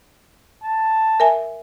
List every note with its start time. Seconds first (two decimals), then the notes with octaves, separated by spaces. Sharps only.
0.64 A5
1.20 A#4 E5 G#5